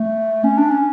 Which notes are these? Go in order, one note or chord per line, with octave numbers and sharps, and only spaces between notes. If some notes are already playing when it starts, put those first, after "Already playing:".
Already playing: A3
C#4
D4
C#4